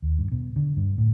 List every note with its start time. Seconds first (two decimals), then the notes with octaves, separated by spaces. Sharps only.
0.02 D#2
0.19 G2
0.32 B2
0.56 D3
0.77 G2
0.98 A2